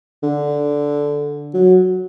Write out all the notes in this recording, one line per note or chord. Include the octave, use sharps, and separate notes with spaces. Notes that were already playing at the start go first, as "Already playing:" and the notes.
D3
F#3